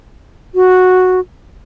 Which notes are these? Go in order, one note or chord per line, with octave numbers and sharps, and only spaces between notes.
F#4